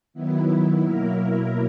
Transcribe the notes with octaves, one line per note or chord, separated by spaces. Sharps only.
D#3 F#3 B3 E4
B2 F#3 A#3 E4 A#4